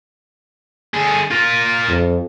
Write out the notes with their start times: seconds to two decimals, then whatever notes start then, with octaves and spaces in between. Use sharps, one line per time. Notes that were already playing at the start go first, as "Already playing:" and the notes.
0.94 D3 G#4
1.31 F4 A#4
1.89 F2